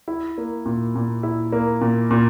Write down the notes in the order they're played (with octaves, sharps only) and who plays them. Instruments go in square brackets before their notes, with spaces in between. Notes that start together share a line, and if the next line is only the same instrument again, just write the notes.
[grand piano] E4
A#3
A#2
A#2
E4
A#3
A#2
A#2